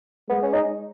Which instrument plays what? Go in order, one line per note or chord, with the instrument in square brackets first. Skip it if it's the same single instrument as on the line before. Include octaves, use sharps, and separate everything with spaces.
[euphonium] G#3 [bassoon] B3
[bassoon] C#4
D#4